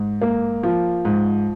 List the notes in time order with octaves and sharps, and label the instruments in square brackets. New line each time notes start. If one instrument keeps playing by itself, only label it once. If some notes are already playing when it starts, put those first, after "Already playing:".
Already playing: [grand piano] G#2
A#3
F3
G#2